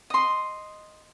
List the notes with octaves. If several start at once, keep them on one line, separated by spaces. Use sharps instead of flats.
D#5 C6